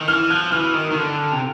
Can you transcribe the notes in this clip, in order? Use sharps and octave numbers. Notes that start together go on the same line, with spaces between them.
D#3
E3 F6
F3 F#6
E3 F6
D#3
D#3
D3
C3